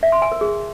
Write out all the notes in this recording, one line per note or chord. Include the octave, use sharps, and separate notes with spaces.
E5
C6
G#5
A#4
G#4